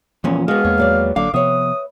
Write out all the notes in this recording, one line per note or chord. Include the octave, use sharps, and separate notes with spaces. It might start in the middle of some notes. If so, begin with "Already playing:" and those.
E2 A#2 F3 A#3 C#4
G#3 B3 F#4 F5
E2 A#3 C#5
D#2 F#3 D5
G#1 D3 F#3 A#3 F5 D6
C3 F3 B3 B4 C#5 E5 D#6